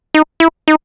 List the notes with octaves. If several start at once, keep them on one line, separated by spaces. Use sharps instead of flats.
D#4
E4
D#4